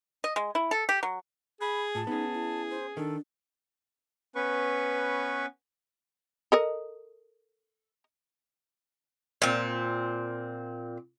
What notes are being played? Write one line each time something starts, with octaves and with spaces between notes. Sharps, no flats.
D#5
G#3
E4
A4
G4
F#3
G#4 B5
A2 F4 A5
B3 C#4 D#4 G#4
E4
C5
D#3 D4 A4
B3 C#4 B4 C#6
A4 A#4 D#5
A#2 C4